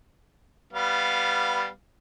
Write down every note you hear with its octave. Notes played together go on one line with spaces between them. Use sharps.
G3 B3 F5